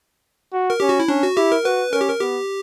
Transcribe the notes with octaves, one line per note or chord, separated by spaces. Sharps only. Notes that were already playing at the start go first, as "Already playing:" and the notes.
F#4
A#4
C#4 G4
F#4
E4
C#4 D4
F#4
E4 G4
A#4
F#4 B4
C#4 A#4
G4
A#4
B3 G4